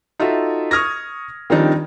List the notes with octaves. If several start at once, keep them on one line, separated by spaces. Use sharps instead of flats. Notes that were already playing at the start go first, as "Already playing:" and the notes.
D#4 F4 F#4 A4 E5
C#6 D#6 F6 G#6 A#6
D#3 F3 G3 C4 D4 D#4